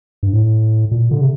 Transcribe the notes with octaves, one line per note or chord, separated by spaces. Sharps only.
G2
A2
A#2
D3
C3